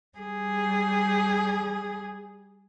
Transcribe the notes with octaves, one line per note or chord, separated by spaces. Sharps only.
G3 G#4